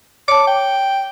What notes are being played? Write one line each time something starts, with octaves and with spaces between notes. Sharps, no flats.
C#5 A5 D6
G5